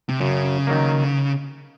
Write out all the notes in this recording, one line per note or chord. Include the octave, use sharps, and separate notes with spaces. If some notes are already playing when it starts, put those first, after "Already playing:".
C3
F#2 C#3
D#3 F#3 A#3